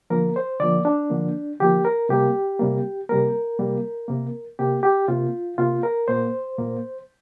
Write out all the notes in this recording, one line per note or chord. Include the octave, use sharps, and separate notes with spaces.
D3 F3 A#3 A#4
C5
D3 F3 A#3 D5
D4
D3 F3 A#3
D3 F3 A#3 G4
A#4
C3 G3 A#3 G4
C3 G3 A#3
C3 G3 A#3 A#4
C3 G3 A#3
C3 A#3
C3 A#3 G4
G4
C3 A#3 F4
C3 A#3 F4
A#4
A#2 A#3 C5
A#2 A#3